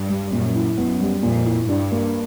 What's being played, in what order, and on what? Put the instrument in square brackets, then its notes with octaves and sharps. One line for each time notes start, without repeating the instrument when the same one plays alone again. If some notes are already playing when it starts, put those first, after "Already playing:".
Already playing: [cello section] G2
[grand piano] G3
[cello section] F#2 [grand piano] A#2
[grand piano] E4
[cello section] F#2 [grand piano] B3
[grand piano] G3
[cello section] F2 [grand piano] A#2
[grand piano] E4
[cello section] G2 [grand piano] D4
[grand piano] A#3